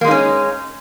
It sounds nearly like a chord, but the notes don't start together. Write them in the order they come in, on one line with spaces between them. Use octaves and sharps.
A#3 G#3 D#4 C#4